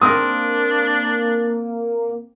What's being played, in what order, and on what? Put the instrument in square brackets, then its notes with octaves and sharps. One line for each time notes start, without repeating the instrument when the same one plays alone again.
[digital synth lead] A#3 [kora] C4 A#4 [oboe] D4 [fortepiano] D#6